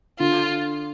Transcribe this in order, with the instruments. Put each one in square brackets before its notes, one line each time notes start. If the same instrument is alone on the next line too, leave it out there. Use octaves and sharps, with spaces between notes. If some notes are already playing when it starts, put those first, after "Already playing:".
[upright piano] D3 [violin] F4